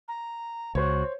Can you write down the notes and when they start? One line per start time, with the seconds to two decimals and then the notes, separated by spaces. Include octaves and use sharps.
0.08 A#5
0.75 C#2 F#4 C5 C#5